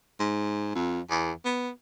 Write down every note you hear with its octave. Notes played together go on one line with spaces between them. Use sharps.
G#2
F2
E2
B3